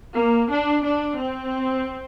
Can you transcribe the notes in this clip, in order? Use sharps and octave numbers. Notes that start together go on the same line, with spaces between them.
A#3
D4
D4
C4